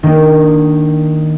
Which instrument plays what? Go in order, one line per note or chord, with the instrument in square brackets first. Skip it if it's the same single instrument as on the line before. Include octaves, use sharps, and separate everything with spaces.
[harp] D#3 A#3 D4 D#4